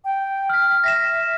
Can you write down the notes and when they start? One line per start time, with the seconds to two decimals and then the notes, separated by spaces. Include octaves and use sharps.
0.05 G5
0.50 F6 B6
0.84 E5 A#6 B6 E7